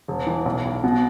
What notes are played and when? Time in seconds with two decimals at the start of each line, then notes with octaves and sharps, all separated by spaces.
0.08 E1
0.27 E3
0.46 B1
0.65 B1
0.84 B2